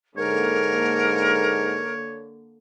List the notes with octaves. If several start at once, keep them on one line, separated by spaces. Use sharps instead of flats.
G#2 D3 A#3 A#4 C#5